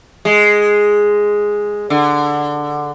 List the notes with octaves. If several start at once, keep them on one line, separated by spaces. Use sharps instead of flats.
G#3
D3